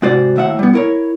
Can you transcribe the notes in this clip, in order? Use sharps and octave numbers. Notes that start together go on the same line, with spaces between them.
G#2 C3 F#4 C5 D5
D#2 A2 E5 F#5
G3 B3
E4 A#4 C#5